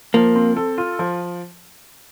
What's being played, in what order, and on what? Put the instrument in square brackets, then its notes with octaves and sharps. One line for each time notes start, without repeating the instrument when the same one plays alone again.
[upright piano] F3 [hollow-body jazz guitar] A#3
[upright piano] C4
A4
F4
F3